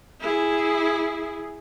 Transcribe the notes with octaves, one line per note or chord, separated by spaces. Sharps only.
E4 G#4